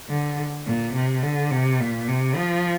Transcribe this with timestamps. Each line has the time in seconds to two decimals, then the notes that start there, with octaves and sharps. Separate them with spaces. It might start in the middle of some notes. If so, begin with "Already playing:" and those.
0.09 D3
0.66 A#2
0.95 C3
1.23 D3
1.51 C3
1.80 A#2
2.08 C3
2.36 F3